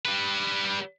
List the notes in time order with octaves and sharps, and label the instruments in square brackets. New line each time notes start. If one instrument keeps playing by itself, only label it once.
[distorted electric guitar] G3 B4